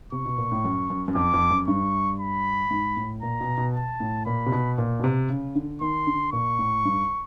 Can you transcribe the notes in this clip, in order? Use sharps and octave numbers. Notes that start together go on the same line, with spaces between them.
C3 C#6
B2
A#2
A2
F#2
F#2
F#2
F2 D6
F2
F#2
G2 C#6
B5
G#2
A2
A#2 A#5
B2
B2
A5
A2
A#2 B5
C3
B2
A#2
B2
C3
C#3
D3
D#3 C6
D3
A#2 C#6
A2
G2